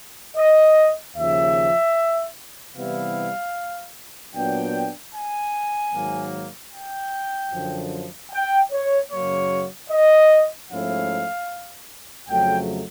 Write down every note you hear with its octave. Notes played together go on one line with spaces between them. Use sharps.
D#5
D#2 C#3 F3 E5
C3 E3 G3 B3 E4 F5
A#2 F#3 B3 D4 G5
G#5
G#2 D#3 F#3 A#3
G5
F#2 D3 F3
G5
C#5
F#2 C#3 F#3 A#3 C#5
D#5
G#2 F3 A3 C#4 E4 F5
F2 C#3 F#3 A3 G5